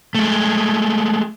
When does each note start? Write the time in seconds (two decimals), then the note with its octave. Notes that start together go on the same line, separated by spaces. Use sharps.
0.15 G#3 A3